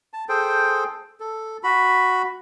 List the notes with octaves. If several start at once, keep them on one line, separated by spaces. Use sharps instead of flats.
A5
G#4 A4 C5 G5
A4
F#4 B5